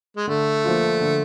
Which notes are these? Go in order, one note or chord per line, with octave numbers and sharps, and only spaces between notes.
G#3
D3 A3
F3 A#3 D4 F4
D3